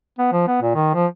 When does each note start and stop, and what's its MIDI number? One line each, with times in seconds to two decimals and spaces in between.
0.19 0.28 59
0.32 0.46 53
0.47 0.58 59
0.62 0.74 46
0.75 0.93 51
0.94 1.06 53